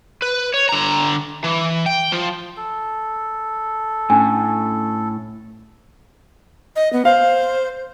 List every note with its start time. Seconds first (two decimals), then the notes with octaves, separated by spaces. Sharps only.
0.22 B4
0.54 C#5
0.69 D3 A#5
1.44 E3
1.86 G5
2.12 F3
2.57 A4
4.10 A2 C#4 D4 G#5
6.76 D#5
6.93 B3
7.05 C5 F5